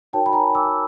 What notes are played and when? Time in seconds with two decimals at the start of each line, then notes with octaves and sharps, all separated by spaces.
0.13 D#4 F#4 A#4 C#5 G5 A5
0.26 B5
0.33 G#5 A#5
0.55 D6 E6